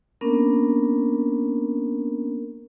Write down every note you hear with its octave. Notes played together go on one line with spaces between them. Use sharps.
A#3 B3 C#4 D4 A#4